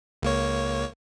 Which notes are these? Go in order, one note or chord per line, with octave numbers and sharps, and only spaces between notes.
C#2 A#3 C#5